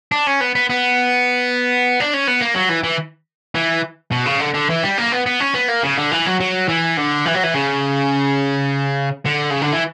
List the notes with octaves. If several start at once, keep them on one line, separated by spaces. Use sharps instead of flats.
D4
C#4
B3
B3
B3
D4
C#4
B3
A#3
F#3
E3
E3
E3
B2
C#3
D3
D3
E3
G3
A#3
B3
B3
C#4
B3
A#3
C#3
D3
E3
F#3
F#3
E3
D3
E3
F#3
E3
C#3
D3
C#3
D3
E3